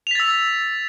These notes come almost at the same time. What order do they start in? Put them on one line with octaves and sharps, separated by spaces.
F7 B6 A6 E6